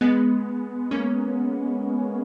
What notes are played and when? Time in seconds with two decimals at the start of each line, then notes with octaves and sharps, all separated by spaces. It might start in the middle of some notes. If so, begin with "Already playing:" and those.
0.01 G#3 B3
0.91 A#3 C#4